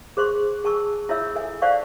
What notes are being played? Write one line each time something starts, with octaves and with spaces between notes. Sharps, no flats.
G#4 C5 C6 C#6
G#4 G#5 A5 C#6 E6
E4 F4 C#5 E5 E6
A4 E5 G#5
C5 D5 F5 F#5 A5 C#6